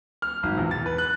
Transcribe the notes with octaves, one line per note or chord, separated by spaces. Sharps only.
F6
G#1
E2
A6
B4
F#6